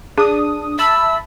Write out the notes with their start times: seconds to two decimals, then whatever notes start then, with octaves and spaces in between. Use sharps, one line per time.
0.18 D4 G#4 D#6
0.79 E5 A5 B5 E6